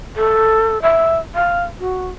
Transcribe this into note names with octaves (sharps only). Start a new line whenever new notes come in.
A4
E5
F5
F#4